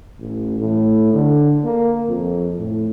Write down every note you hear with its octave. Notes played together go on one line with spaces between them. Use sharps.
A1
A2
D3
A#3
F2
A2